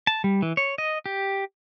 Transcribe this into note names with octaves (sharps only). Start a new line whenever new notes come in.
A5
G3
E3
C#5
D#5
G4